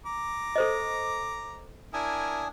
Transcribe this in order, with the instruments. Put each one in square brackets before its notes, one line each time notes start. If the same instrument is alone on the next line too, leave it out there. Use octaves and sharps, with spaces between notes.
[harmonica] A#5 D6
[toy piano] A4 C5 D#5
[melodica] D4 G#5 D#6 [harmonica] E4 A#4